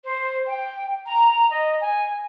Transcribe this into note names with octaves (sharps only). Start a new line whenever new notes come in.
C5
G5
A#5
D#5
G#5